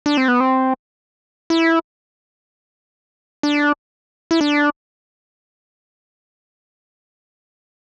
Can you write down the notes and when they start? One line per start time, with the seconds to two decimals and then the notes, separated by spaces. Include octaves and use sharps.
0.06 D4
0.17 C4
0.28 B3
0.40 C4
1.50 E4
3.43 D4
4.31 E4
4.41 D4